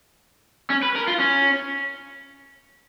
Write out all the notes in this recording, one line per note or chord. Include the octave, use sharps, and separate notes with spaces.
C#4
B4
A#4
F4
C#4